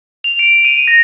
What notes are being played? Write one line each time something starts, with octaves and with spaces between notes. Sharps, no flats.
F7
D7
D#7
A#6